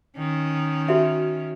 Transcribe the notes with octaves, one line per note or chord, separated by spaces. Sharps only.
D#3 C#4
F#4 E5